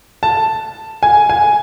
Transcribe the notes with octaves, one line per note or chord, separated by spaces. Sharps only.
A5
G#5
G#5